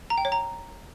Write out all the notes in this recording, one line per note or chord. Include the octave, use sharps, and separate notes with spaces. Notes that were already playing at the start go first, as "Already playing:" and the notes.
A#5
G5
C#5
A#5